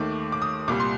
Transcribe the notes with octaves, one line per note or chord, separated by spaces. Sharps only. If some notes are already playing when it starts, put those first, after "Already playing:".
Already playing: D#2 D#3 A3 D6
D6
D#6
C2 A#2 G3 D6
C6